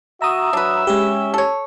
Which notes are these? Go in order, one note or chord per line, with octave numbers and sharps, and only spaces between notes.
F#4 E5 A#5 D#6
F#3 D4 B4
G#3 C#4 G4
A4 C#5